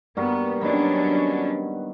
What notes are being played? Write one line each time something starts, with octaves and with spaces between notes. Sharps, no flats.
G2 A#3 B3 F#4
D#3 F#3 B3 C#4 D4